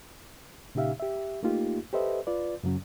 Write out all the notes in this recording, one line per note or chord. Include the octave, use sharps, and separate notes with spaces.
A#2 C#3 D#4 G4 E5 F5
G4 E5
A3 A#3 D#4 F4 G4
G4 A4 B4 C5 D#5 E5
F4 B4 D5
F#2 C#3 F#3 C#4